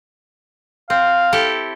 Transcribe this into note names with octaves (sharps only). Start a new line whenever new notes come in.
C4 F5
E4 G4 A4